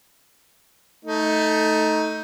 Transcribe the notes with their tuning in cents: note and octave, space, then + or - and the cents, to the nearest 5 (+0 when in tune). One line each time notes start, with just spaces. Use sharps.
A3 +0 D#4 +15